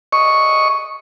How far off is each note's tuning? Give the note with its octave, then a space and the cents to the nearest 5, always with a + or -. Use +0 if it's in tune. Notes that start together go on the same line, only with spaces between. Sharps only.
D#5 +0 C#6 +0